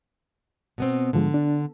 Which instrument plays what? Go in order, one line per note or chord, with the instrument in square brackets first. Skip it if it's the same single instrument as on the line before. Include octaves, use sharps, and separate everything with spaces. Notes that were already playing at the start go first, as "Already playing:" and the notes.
[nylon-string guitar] B2 B3 C4
[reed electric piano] G#2 F3 G#3 [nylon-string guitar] D3
[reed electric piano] D4